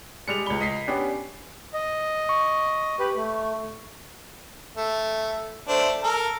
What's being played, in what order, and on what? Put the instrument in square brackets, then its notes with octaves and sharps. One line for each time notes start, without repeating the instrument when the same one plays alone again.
[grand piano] G3 G#3 [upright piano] C#7 F7
[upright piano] C#2 B5 [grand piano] G7
[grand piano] D#5 B6 C7
[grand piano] B3 C#4 D4 [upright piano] G4
[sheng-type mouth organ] D#5
[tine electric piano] C#6
[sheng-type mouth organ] G4 B4
A3
[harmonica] A3
A3 D4 C5
A4 A#4